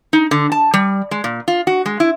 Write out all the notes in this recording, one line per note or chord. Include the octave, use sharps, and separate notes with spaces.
D#4
D3
A5
G3
G#3
A#2
F4
F#4
G#3
E4